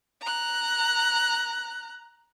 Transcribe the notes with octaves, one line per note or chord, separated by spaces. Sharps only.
A#5 F#6